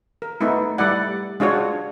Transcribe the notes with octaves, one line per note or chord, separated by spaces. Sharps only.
A#4
A3 B3 D#4 E4
G3 A3 E4 D5 F#5
G#3 D4 F4 F#4 C#5